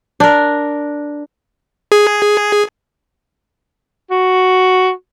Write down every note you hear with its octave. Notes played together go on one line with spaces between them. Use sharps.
D4 A#4
G#4
F#4